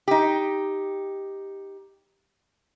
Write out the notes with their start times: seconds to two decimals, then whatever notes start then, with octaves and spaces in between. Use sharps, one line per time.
0.08 D#4 G4